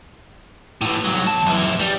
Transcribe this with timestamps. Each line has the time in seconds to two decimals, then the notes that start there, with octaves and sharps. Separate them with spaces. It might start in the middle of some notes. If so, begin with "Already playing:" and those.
0.82 A2 E3
1.05 C2 F#3
1.27 E2 A5
1.46 F#2 E3
1.79 G3